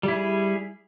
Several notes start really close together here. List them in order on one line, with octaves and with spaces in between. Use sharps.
G3 E4 G#4